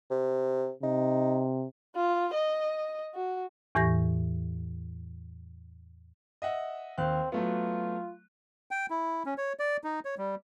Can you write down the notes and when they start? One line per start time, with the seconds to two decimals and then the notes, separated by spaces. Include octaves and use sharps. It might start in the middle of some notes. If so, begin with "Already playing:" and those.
0.11 C3
0.83 C3 D#4
1.95 F4
2.33 D#5
3.14 F#4
3.75 E2 A2 E3 G4 C#6 A#6
6.42 D#5 E5 F#5
6.98 D#2 C4 F5 F#6
7.32 F#3 A3 B3 F4
8.71 G5
8.90 E4
9.26 C#4
9.38 C#5
9.59 D5
9.84 D#4
10.05 C#5
10.18 G3